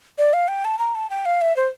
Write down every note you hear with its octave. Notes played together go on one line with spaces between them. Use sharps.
D5
F5
G5
A5
A#5
A5
G5
F5
E5
C5